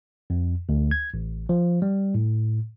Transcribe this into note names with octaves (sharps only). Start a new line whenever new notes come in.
F2
D2
G#6
A1
F3
G3
A2